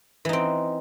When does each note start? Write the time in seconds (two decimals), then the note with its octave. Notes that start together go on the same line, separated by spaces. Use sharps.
0.25 E3
0.29 D#4
0.33 C4